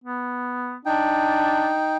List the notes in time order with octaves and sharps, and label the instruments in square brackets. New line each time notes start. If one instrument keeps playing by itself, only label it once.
[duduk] B3
[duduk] D4 [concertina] D#4 G5